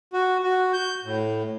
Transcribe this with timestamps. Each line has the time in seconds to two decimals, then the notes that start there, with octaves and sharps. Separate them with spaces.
0.13 F#4
0.44 F#4
0.73 G6
1.04 A2